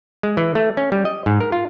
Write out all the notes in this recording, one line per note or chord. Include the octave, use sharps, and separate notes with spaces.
G#3
E3
A3
C#4
G3
D#5
G#2
A#4
F4